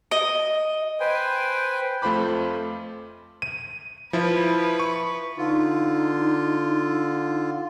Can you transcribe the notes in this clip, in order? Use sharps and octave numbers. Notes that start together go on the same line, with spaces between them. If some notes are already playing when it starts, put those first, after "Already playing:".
D#5
B4 C5 G5 G#5
F2 A3 F4 C5 B5 D6
D#7
F3 E4 B4
C#6
D3 D#4 F4